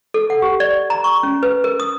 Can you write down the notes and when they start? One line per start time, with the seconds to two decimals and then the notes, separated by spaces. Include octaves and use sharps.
0.14 A4
0.30 F#5
0.42 G4
0.60 D5
0.90 A#5
1.04 C#6
1.23 C#4
1.43 B4
1.64 A#4
1.80 D#6